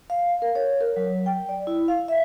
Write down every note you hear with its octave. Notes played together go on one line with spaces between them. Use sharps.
F5
A#4
C#5
A#4
F#3
G5
D5
E4
F5
E5